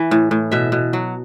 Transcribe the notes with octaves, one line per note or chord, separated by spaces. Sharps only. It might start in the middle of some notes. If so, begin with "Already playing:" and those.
Already playing: E3
A2
A2
B2 E5
B2
F#3